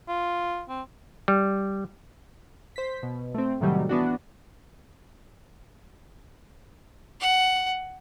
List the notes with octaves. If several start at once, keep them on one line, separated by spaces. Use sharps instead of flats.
F4
C4
G3
C5 B6
B2
A3 C4
A2 C3 D#3 F#3 G3 A3
E3 B3 D4 F#4
F#5